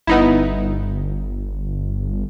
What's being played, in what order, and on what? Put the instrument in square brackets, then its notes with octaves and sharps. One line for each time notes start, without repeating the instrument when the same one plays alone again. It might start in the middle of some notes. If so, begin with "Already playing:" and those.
[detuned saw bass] G1 [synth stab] B3 D#4 E4